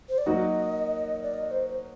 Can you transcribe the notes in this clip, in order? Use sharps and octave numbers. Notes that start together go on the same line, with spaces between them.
C5
D5
F#3 A#3 D#4 F#4 A#4 D#5
D5
D#5
C5
C5